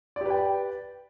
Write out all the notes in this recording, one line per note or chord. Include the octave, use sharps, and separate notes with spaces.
G4 B4 D5 G5